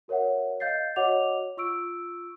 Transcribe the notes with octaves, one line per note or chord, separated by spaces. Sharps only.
F#4 A#4 C#5 E5 F#5
D#5 F5 G6 A6 C7
F#4 C#5 D#5 F#5 D6 F7
F4 C#6 E6 D7